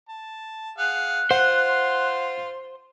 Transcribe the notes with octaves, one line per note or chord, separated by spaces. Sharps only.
A5
G#4 F5 F#5 F#6
F4 C5 F#5 C6